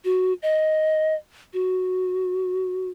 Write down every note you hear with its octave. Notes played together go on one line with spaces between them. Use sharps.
F#4
D#5
F#4